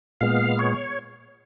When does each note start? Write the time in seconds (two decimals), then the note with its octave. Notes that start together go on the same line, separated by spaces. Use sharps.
0.21 A#2 G#3 B3 F5
0.59 C#5